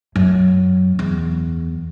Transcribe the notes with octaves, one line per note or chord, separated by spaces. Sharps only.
F#2
E2